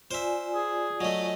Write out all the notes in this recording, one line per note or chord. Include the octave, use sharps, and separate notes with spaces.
F4 C5 D5 E5 G#5
G#4
F#3 A3 D#5